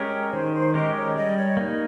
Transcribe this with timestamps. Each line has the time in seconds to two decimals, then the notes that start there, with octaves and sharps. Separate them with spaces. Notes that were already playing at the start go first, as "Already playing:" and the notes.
Already playing: G#3 C#4 G4 A#4 C#5
0.32 D#3 C5
0.54 C5
0.74 G#3 C#4 G4 A#4 D#5
0.95 C#5
1.16 G3 D#5
1.37 C#5
1.57 A#3 D#4